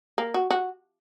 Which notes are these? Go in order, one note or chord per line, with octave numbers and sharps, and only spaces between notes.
A#3
F#4
F#4